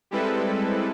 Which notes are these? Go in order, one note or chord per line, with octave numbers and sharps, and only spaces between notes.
G3 G#3 C4 E4 A4 B4